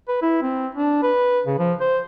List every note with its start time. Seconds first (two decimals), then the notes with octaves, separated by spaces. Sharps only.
0.08 B4
0.22 E4
0.42 C4
0.75 D4
1.03 B4
1.47 C#3
1.59 F3
1.81 C5